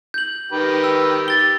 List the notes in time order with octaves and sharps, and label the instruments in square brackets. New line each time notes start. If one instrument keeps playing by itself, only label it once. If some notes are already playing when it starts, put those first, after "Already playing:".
[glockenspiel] G6 F#7
[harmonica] D#3 G4 B4
[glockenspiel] E6
[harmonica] G4 [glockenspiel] A6 G7